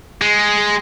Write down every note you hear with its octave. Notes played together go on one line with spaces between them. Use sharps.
G#3